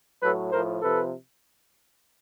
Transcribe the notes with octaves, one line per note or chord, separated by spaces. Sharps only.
A2 F#3 A4 B4
A2 F3 A#4 C5
C3 F3 A4 B4